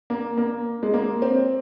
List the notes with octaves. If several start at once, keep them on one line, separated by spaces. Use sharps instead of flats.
A#3
A#3
G#3
A#3
C4